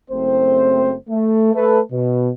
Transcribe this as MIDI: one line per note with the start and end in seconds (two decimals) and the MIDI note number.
0.11 0.94 30
0.11 0.94 57
0.11 0.94 60
0.11 0.94 72
1.10 1.53 57
1.54 1.80 57
1.54 1.80 69
1.54 1.80 71
1.92 2.29 47